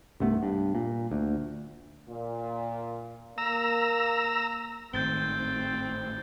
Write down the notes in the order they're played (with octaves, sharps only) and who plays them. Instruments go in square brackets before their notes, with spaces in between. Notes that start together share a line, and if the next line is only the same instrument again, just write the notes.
[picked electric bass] C2 G2 A3 B3
G2
A#2
D2
[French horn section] A#2
[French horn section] A#3 [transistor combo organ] A#5 E6
[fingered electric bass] G#1 A2 D#3 [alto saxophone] C4 [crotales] G6 A6 G7